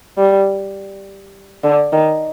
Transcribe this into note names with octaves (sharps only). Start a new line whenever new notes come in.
G3
D3
D#3